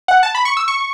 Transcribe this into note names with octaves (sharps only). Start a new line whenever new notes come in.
F#5
A5
B5
C#6
E6
C#6